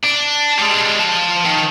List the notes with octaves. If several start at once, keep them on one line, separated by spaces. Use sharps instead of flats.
D4
G3 G#3
F3 A5
D#3